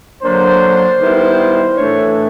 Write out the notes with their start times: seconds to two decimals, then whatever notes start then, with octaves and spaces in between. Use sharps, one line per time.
0.23 D3 F#3 A#3 D4 C5
1.00 D#3 G3 B3 E4
1.77 A2 E3 A3 D4 C#5